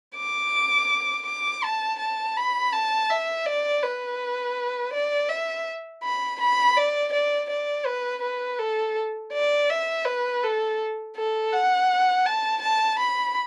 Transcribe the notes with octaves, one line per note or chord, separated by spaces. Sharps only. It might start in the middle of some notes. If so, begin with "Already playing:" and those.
D6
D6
A5
A5
B5
A5
E5
D5
B4
D5
E5
B5
B5
D5
D5
D5
B4
B4
A4
D5
E5
B4
A4
A4
F#5
A5
A5
B5